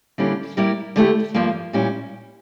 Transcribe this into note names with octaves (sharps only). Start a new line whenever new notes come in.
D3 G3 A#3 C#4 E4
G3 A#3 E4 A#4 D5
D3 A3 E4 G4
G2 F3 A#3
A#2 G3 C#4 E4